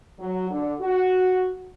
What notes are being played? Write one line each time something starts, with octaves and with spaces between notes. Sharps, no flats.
F#3
D3
F#4